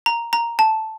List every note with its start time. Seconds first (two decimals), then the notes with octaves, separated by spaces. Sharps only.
0.06 A#5
0.33 A#5
0.59 A5